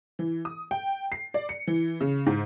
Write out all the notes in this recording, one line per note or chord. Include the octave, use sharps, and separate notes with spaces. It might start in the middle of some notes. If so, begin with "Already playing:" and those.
E3
D#6
G5
C7
D5
C#7
E3
C#3
G#2